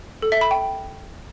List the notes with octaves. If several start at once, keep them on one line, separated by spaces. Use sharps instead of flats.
A4
E5
B5
G5